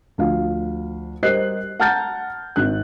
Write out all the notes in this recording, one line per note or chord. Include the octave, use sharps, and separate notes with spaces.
D2 F3 F5
G3 A#4 C5 D#5 F#6 C7
F#5 A5 A#5 F6 G6 A6
G#1 F#6